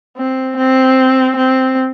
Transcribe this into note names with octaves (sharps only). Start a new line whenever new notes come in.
C4
C4
C4